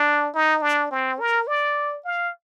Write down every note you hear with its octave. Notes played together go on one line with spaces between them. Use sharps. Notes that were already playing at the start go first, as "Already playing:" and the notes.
Already playing: D4
D#4
D4
C4
A#4
D5
F5